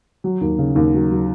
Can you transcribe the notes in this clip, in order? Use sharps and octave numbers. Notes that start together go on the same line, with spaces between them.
F#3
D#2
C#3
D#2
F#3
F#3